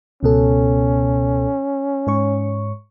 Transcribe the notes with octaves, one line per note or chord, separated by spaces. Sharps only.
C#2 B2 C#4 A4
G#2 C#5 C#6